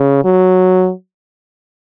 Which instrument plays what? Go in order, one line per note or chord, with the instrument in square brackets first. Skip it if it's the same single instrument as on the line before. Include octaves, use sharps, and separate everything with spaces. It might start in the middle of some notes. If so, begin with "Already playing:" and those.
Already playing: [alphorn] C#3
F#3